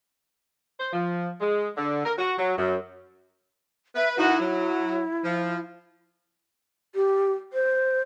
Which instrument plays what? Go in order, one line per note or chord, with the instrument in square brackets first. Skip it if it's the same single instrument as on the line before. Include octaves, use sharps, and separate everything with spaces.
[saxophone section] C5
F3
G#3
D3
A#4
F#4
F#3
F#2
[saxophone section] B4 [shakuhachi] E5
[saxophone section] D#3 D#4 F#4 [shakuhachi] E4
[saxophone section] F#3
F3
[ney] G4
C5